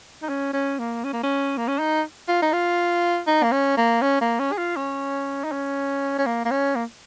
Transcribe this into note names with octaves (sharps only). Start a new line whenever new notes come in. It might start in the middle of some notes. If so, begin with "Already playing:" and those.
D#4
C#4
C#4
A#3
C#4
A#3
C#4
A#3
C#4
D#4
F4
D#4
F4
D#4
A#3
C#4
A#3
C#4
A#3
C#4
G#4
F4
C#4
D#4
C#4
C#4
A#3
A#3
C#4
A#3